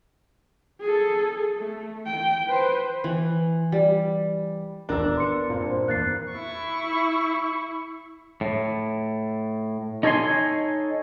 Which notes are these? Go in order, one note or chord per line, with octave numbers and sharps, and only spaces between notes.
G#4 A4
A3
G5
B4 C5
E3
G3
D#1 E2 D4 A#4 E6
B3 C6 C#7
G2 A#2 C4
C5
E2 G2 A#3 F#6 A6 C7
E4 C#6
A2
D#4 A4 C#5 D5 G#5 C6